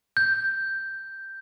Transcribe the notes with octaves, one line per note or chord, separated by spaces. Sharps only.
G6